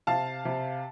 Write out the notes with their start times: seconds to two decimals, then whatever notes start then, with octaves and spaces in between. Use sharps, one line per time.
0.07 C3 F5 A5
0.45 C3